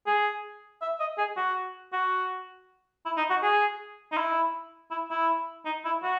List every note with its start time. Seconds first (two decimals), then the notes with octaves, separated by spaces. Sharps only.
0.06 G#4
0.82 E5
1.00 D#5
1.18 G#4
1.37 F#4
1.93 F#4
3.06 E4
3.17 D#4
3.30 F#4
3.43 G#4
4.12 D#4
4.17 E4
4.91 E4
5.11 E4
5.65 D#4
5.85 E4
6.03 F#4